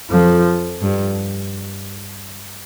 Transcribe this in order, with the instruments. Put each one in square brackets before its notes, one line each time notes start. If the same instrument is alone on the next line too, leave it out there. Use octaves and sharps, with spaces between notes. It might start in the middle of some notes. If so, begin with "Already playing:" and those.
[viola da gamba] F2 [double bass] F3
[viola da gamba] G2